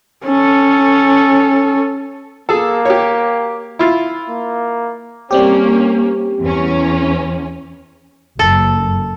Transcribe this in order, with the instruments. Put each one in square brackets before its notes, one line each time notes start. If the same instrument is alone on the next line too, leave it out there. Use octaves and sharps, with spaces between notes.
[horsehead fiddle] C#4 A4
[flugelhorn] A#3 [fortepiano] G#4 A4
[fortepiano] G4 C#5
E4 F4
[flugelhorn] A#3
[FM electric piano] G3 C4 G4 [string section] A#3 C#4
[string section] E2 C#4
[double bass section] F#1 [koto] A4